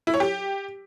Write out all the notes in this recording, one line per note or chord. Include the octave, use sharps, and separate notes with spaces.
E4
C#5
G4